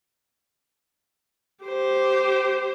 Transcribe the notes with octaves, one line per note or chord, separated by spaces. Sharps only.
G4 C5